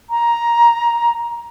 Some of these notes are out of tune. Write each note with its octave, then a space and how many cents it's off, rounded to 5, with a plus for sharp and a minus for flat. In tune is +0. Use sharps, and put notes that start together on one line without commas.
A#5 +10